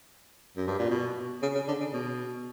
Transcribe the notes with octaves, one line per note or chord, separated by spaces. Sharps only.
F#2
G2
A#2
B2
C#3
C#3
D3
C#3
B2